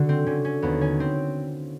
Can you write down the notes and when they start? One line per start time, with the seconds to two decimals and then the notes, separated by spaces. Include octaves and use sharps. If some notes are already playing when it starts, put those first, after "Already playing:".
Already playing: D3 F#4
0.09 C4
0.26 D3 C#4
0.45 C#4
0.62 D#2 B3
0.81 C#4
1.00 C4